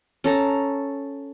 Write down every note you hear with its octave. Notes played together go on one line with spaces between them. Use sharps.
C#4 A4 A#5